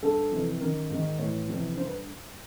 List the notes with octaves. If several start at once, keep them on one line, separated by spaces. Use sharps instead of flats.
G2 D3 A4
F2 C3 E3
F#2 D#3 A#4
G#2 D#3
A2 E3 C#5
F2 C3 E3
G2 D3 C5
B4